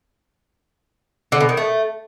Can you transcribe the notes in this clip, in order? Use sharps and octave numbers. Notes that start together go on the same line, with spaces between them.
D3
B2
D#3
A3